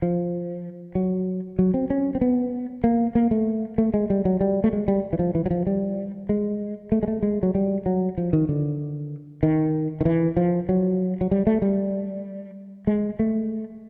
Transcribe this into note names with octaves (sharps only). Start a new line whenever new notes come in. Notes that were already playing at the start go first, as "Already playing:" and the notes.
F3
F#3
F#3
C4
C#4
C4
B3
A#3
A#3
A3
A3
G#3
G3
F#3
G3
A3
G#3
G3
E3
F3
E3
F#3
F3
G3
G#3
A3
G#3
A3
G#3
F#3
G3
F#3
F3
D#3
D3
D#3
D#3
E3
F3
F#3
F#3
G3
A3
G3
G#3
A3